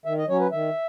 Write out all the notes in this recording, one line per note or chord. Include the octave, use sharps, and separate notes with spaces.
D#3 E5
D#5
F#3 C#4 C#5
B4
D#3 E5